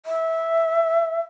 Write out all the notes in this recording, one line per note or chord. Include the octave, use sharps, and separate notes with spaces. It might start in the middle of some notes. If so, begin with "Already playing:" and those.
E5